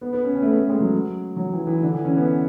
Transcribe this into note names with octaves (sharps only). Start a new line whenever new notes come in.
B3
B3
C#4
C#4
A3
B3
A3
G#3
F#3
F#3
E3
E3
D3
E3
C#4
B3